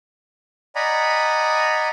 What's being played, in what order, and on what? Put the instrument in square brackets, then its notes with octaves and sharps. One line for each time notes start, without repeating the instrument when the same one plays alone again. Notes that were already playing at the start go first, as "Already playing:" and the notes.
[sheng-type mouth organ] D5 D#5 F#5 G#5 A#5 B5